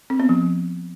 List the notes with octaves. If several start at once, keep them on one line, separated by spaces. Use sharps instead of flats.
C4
B3
F3